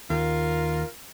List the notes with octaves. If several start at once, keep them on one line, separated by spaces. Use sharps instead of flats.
D#2 F4 A#4